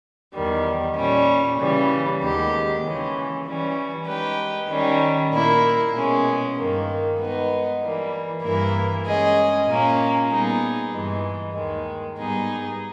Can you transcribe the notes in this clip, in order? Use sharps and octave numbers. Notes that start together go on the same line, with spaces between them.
E2 D#3 G3
A#2 G3 C#4
C#3 E3 G3
D#2 D#3 G#3 B3 G4
C#3 E3 G#3 C#4
E3 G3 C#4
G#3 D#4 G4 B4
D#3 G3 C#4
A#2 A#3 E4 A#4
B2 G#3 C#4
G2 D#3 A#3
G#3 B3 D#4
E3 G3 A#3
G2 E3 A#3 E4 A#4
G#3 C#4 G#4 D#5
A#2 A#3 C#4
A#2 G3 B3 D#4 G#4
G2 E3 G#3
D#2 D#3 G#3
G#2 G3 B3 D#4 G#4